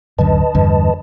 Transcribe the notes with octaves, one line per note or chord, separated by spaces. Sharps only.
D1 F#2 D3 B4 D#5 A5
E2 G2 D3